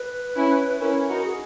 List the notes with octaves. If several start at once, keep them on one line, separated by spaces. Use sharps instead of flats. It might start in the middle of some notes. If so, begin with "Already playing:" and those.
Already playing: B4
C#4 E4
C#4 E4 A#4
D#4 F#4
G#4